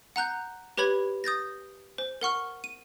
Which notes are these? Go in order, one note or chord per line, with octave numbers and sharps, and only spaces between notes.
F#5 A#5 F#6 G6
G4 B4 C#5 B5 G#6
D#6 G6 A6 A#6
C5
A#4 F#5 C#6 F6
D#7